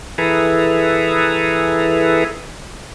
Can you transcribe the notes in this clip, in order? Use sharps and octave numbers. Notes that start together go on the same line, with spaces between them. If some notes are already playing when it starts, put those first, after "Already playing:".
E3 E4 G#4 A4 B4 A#5